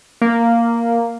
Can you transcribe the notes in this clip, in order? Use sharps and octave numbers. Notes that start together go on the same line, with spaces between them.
A#3